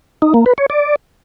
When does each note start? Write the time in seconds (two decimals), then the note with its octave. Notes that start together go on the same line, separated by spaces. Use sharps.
0.22 D#4
0.34 A#3
0.46 B4
0.58 C#5
0.70 D5